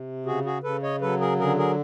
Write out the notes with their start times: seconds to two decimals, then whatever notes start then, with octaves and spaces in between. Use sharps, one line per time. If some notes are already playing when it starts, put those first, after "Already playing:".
Already playing: C3
0.26 C#3 F#4 G#4
0.45 F#4 G#4
0.63 C#3 A4 B4
0.83 C#5 D#5
1.01 F#3 A4 B4
1.20 G#4 A#4
1.39 D3 G#4 A#4
1.58 G#4 A#4